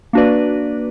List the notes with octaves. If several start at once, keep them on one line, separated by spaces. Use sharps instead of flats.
A#3 D4 F#4 B4 D5